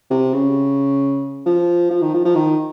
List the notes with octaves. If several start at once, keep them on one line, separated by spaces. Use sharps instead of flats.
C3
C#3
F3
F3
D#3
F3
F3
D#3